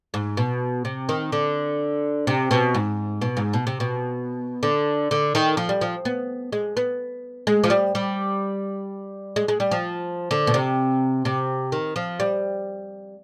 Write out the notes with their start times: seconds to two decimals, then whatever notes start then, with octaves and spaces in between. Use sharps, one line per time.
0.14 G#2
0.37 B2
0.85 C3
1.09 D#3
1.32 D3
2.27 C3
2.51 B2
2.75 G#2
3.22 B2
3.37 G#2
3.53 B2
3.67 C3
3.80 B2
4.63 D3
5.11 D3
5.35 D#3
5.57 F3
5.69 G3
5.81 F3
6.05 B3
6.52 G#3
6.77 B3
7.47 G#3
7.64 F3
7.70 G3
7.95 G3
9.36 G#3
9.48 G#3
9.60 G3
9.71 F3
10.31 D3
10.47 B2
10.54 C3
11.25 C3
11.72 D#3
11.96 F3
12.20 G3